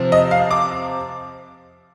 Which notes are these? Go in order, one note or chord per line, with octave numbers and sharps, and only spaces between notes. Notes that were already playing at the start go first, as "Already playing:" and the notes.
Already playing: C3 F3 C4
D#5
F5
D6